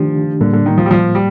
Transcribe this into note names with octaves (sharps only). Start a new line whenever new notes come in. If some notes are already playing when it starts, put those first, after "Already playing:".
Already playing: D#3 F3 A3 D4 G4
A2 D3 G3 A#3
D3
D#3
F3
G3
F3
G3